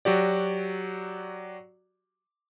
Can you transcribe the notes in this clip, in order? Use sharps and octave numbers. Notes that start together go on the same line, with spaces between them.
F#3 F#4 G4 D5